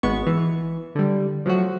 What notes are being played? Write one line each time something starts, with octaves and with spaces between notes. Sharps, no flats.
G#1 G#3 B3 C#6
E3
D3 G3
F3 F#3 A3 F#4